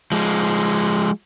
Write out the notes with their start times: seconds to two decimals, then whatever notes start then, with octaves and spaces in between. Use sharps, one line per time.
0.12 F3 G#3